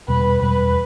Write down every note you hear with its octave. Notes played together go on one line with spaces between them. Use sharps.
E2 B2 G3 B4
E2 B2 G3 B4